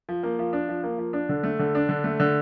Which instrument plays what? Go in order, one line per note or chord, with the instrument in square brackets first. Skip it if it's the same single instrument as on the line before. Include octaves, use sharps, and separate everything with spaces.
[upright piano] F3
A#3
F3
D4
F3
A#3
F3
D4
D3
A3
D3
D4
D3
A3
D3